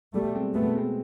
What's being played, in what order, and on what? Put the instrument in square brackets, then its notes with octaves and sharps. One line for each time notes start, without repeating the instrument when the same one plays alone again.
[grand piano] B2 [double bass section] G3 A3
[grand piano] G#3 C4
[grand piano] B2 [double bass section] A3 B3
[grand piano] G#3 C4